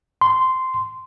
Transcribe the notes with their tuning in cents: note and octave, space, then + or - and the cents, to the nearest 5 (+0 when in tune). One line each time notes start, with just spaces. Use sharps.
C6 -10